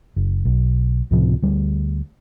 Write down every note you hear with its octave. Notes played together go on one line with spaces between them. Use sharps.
F#1
B1
C#2 A2 C3 F3
D2 G3